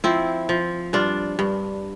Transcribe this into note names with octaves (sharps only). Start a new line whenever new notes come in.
F3 C4 E4
F3
G2 D4 F4
G2